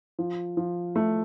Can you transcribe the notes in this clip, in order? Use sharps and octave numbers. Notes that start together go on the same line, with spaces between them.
F3
F3
A3